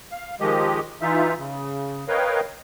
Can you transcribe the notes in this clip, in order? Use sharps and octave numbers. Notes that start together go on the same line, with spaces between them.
F5
D#3 F3 G#3 G4 D#5
E3 D#4 F4 E5
C#3
A#4 B4 C#5 D#5 F5 G5